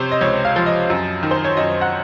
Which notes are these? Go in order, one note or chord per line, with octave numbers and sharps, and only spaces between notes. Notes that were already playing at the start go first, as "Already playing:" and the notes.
Already playing: C3 C5 C#5
D#5
C#2 C#5
F5
F3
D#5
F#2
D#3
C5
C#5
F#2 D#5
F#5